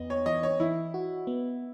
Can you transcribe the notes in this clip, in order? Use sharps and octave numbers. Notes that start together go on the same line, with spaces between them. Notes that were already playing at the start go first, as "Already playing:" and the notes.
Already playing: E2 B3 D#5
C#5
E3 D#5
C#5
E3 E4
F#4
B3